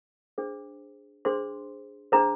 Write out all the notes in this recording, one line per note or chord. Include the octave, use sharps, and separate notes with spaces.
D4 G#4 C5
D4 G#4 C5 C6
D4 G#4 C5 A#5